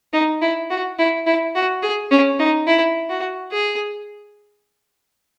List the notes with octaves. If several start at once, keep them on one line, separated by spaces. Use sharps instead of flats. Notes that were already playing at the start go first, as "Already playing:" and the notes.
D#4
E4
F#4
E4
E4
F#4
G#4
C#4
D#4
E4
F#4
G#4